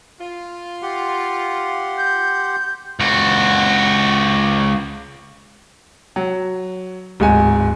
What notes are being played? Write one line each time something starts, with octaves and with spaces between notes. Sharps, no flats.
F4
G4 F#5 C6
G6
C#2 F#4
F#3
D1 G#2 G#5